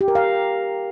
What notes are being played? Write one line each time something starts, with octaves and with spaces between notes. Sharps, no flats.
G4
A#4
F5